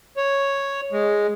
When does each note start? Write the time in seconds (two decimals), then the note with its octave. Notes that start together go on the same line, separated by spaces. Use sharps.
0.17 C#5
0.92 G#3